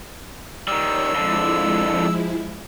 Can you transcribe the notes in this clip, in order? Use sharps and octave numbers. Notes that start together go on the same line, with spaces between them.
D#3 G3 C#5 E6
F2 D3 F3 G#3 E4